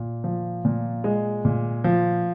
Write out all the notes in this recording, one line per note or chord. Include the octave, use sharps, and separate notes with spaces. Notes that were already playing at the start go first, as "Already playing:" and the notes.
Already playing: A#2
F3
A#2
G#3
A#2
F3